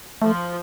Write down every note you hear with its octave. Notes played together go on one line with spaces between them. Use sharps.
F3 A3